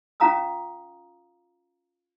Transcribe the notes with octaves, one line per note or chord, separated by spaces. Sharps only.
C#4 F4 F5 A#5 D#6 E6